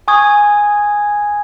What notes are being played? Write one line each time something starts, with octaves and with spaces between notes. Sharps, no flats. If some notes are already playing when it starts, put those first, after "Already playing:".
G#5 C#6 D#6 G#6